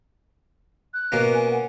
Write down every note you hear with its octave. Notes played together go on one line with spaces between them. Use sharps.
F#6
B2 A#3 C#4
G#5
F#5